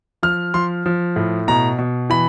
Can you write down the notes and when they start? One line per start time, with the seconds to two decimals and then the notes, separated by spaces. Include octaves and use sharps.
0.23 F3 F6
0.54 F3 C6
0.86 F3
1.16 A2
1.48 B2 A#5
1.79 B2
2.10 E3 B5